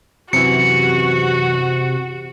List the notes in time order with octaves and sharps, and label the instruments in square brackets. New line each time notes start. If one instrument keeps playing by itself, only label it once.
[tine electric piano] F#2 E3 [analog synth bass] C3 [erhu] F#4 [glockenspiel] C#7